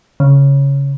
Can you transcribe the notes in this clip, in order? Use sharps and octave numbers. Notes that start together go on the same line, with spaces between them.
C#3